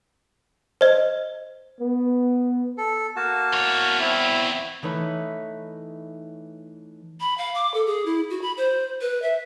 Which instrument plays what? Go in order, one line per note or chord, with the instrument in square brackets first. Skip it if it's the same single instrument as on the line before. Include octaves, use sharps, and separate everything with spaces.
[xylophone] C5 D#5
[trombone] B3
[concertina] A4
A#3 F#4 A5
[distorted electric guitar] E2 C#5
[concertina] C4 E4
[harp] E3 A3 D#4 B4 C#5
[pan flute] B5
F5
D6
A4
G#4
E4
F#4
B5
C5
B4
E5